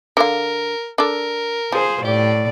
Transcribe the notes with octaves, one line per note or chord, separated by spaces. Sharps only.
D3 A#4 F5
D4 A4 A#4
F3 G#4 C5
A2 G4 D5